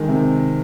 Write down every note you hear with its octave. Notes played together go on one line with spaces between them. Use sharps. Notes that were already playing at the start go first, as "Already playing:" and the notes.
Already playing: D#3 G#3
C3